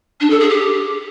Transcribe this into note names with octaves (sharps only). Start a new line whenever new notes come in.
D4
A4
G#4
G4